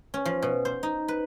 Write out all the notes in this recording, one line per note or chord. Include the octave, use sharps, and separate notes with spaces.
C#4
F3
B2
C5
D#4
B4